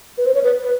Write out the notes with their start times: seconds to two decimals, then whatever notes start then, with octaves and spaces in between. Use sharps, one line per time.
0.18 B4
0.26 C5
0.35 C#5
0.44 B4
0.61 B4